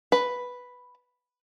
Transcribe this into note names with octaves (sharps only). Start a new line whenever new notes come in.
B4